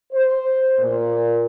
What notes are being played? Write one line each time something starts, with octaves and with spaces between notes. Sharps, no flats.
C5
A#2